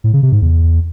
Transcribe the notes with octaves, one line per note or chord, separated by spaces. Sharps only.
A2
C#3
C3
G#2
E2